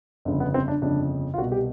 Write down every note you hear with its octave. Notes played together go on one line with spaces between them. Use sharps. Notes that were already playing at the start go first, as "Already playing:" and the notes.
G1 F2 C#3
B3
C4
D4
G1 F2 C#3 D4
F4
C2 B2 F#4
G4